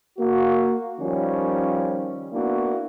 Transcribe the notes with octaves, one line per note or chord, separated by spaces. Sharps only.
A#3 F#4
D#3 F3 G3 C#4
A#3 B3 D4 E4 F#4